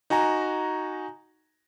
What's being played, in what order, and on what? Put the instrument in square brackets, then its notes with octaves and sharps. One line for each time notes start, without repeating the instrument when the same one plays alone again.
[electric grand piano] D#4 F#4 G#5 A#5